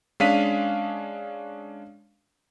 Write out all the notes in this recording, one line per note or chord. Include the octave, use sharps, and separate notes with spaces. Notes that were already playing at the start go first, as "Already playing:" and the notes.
G#3 C#4 D4 F5 B6 D#7